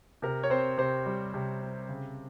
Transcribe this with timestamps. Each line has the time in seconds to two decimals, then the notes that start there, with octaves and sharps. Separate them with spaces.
0.22 C3 A#4
0.43 C#5
0.50 C4 C5
0.78 C3 C5
1.06 G3
1.34 C3
1.61 C4
1.89 C#3